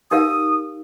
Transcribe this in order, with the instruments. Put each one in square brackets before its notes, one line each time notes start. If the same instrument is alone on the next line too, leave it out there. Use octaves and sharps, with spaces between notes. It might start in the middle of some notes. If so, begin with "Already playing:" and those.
[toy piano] D#4 G4 A#4 F5 [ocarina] D#6